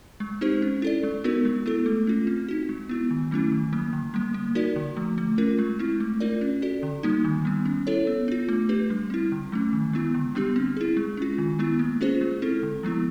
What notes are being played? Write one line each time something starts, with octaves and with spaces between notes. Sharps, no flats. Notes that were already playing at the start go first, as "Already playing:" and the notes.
G#3
C4 D#4 G4 C5
C#4
E4 A4 D5
G#3
B3 D#4 F#4 A#4
G#3
B3 E4 A4
A3
C#4 F4
C4
D#4 F#4
G#3
B3 E4
D#3
F#3 A3 C#4 E4
D#3
F#3 A#3
D3
G3 A#3
A#3
D#4 F#4 A#4 D5
D3
F3 A3
A3
C#4 F4 A#4
G#3
C4 E4
A3
D4 F4 A#4 D5
C#4
F#4 A4 D5
D3
G3 A#3 D#4
D#3
G3 B3
C#4
E4 A4 C#5
B3
D4 F4
A3
D4 G4 B4
G3
C4 E4
D3
F#3 A3 C#4
D#3
G#3 B3 E4
D3
G3 B3 D4 G4
C4
E4 G#4
G#3
C#4 F4
D#3
G#3 B3 E4
A#3
C#4 F4 G#4 C5
G#3
C4 E4 A4
D3
F3 G#3 B3 E4